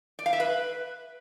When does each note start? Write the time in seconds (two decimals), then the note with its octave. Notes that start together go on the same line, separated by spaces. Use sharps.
0.19 D5
0.26 F5
0.33 E5
0.40 B4